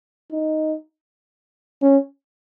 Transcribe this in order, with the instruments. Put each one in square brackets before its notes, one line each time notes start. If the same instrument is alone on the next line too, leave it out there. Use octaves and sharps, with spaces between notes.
[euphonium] D#4
C#4